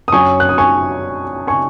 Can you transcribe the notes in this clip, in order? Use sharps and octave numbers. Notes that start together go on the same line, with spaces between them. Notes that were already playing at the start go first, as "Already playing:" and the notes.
D#6
F#2 F#3 C#4 G#5 C#6
F#6
D#6
G#5 C#6
G#5 C#6